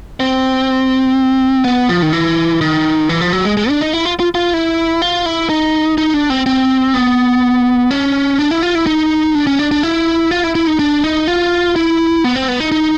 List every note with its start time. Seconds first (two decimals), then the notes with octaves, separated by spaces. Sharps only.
0.20 C4
1.64 B3
1.89 F3
2.02 D#3
2.13 E3
2.61 D#3
3.09 E3
3.21 F3
3.33 F#3
3.45 G#3
3.57 G#3
3.69 D4
3.81 D#4
3.93 E4
4.05 F4
4.20 F4
4.35 F4
4.53 E4
5.02 F4
5.26 E4
5.50 D#4
5.98 D#4
6.14 D4
6.30 C4
6.46 C4
6.94 B3
7.91 C#4
8.39 D4
8.51 E4
8.63 F4
8.75 E4
8.87 D#4
9.35 D4
9.47 C#4
9.59 D4
9.71 D4
9.83 E4
10.31 F4
10.44 E4
10.55 E4
10.67 D#4
10.79 D4
11.04 D#4
11.27 F4
11.76 E4
12.24 B3
12.36 C4
12.48 B3
12.60 D#4
12.72 D#4